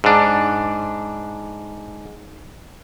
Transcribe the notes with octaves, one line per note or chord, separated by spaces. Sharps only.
G#2 D4